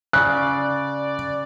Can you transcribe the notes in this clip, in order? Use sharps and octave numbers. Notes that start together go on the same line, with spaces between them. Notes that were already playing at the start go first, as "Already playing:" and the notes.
C#3 D5 F#6